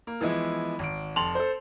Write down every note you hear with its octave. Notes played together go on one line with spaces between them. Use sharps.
A#3
E3 F3 G#3 B3 E4
G#1 D7
F1 A5 C6 F7 F#7
A4 C5